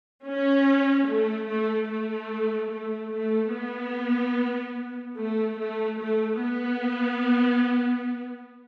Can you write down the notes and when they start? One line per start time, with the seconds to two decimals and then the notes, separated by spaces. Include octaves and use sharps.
0.25 C#4
1.07 A3
1.48 A3
1.89 A3
2.71 A3
3.11 A3
3.53 B3
5.17 A3
5.58 A3
5.99 A3
6.39 B3